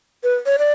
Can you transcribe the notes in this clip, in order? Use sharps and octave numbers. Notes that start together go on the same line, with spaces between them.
B4
C#5
D5